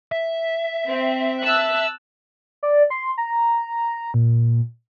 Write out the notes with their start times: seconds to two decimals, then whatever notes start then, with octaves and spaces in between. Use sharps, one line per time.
0.12 E5
0.88 C4
1.39 A5 E6 F#6
2.63 D5
2.90 C6
3.18 A#5
4.14 A#2